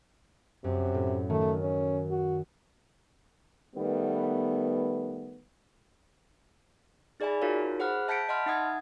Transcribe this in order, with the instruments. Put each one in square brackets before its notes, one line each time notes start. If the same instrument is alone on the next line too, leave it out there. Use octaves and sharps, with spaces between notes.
[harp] F#2 [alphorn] C3
[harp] A2
[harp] D#3 [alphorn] A3
[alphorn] C#4
F#4
[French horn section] D#3 G3 A3 B3
[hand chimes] D#4 G#4 D5 E5 G#5 B5
D#4 F4 F#4 A#4 C#5 F5
G#4 C5 F#5 B5 F6 F#6
E5 A5 G6 B6 C#7 D7
D#5 F#5 A5 B5 C6 F6
D#4 E5 F#5 D#6 G#6